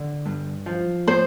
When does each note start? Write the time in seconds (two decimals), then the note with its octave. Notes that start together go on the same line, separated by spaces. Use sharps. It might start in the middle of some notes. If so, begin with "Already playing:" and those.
Already playing: D3
0.26 G2
0.66 F3
1.08 A2 C5